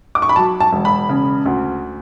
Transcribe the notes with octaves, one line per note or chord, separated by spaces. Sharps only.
D6
C#6
B5
F#3 A5
A5
E1
B5
C#3
D2